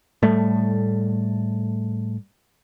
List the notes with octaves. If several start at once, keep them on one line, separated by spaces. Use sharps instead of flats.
A2 G3 A3